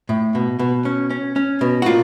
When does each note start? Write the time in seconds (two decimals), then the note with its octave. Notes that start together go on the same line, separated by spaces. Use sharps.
0.09 A2
0.35 B2
0.59 B2
0.85 C#4
1.10 C#4
1.36 C#4
1.61 B2
1.82 F#4
1.86 A#2 F4